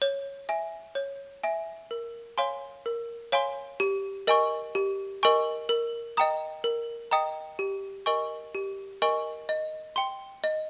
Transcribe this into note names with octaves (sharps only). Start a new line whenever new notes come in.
C#5
E5 G#5
C#5
E5 G#5
A#4
C#5 F5 G#5 C6
A#4
C#5 F5 G#5 C6
G4
A#4 D#5 G#5 C#6
G4
A#4 D#5 G#5 C#6
A#4
D#5 G5 A#5 D#6
A#4
D#5 G5 A#5 D#6
G4
A#4 D#5 G#5 C#6
G4
A#4 D#5 G#5 C#6
D#5
G5 C6
D#5